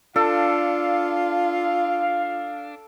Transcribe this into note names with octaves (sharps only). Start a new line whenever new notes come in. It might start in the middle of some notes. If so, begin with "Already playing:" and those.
D4 F4 A4 F5